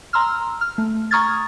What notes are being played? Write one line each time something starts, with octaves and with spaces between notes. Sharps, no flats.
A#5 C6 E6 F6
F6
A3
A#5 C#6 D#6 F6 G#6 A6